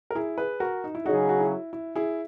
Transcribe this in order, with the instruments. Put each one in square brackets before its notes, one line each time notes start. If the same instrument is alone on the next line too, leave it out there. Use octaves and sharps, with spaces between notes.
[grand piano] A#4
E4 G#4
G#4 B4
F#4 A#4
D#4
E4
[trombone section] C#3 F#3 C#4 G#4 [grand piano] D#4 F#4
[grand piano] F#4
E4
E4
E4 G#4